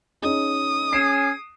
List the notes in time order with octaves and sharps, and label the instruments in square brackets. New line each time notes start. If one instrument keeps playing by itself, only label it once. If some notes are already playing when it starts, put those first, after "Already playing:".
[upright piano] C#4 D#4 G#4 [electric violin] D#6
[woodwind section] C#4 G#4 [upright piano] C7 D7 E7